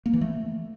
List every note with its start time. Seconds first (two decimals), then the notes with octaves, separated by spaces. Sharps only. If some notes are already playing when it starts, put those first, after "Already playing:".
0.06 A#3
0.13 E3
0.21 A3